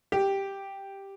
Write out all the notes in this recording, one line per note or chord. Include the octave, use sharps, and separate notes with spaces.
G4